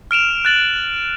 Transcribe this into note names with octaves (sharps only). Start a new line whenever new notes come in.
F6 D7 E7 F7
F#6 A6 F#7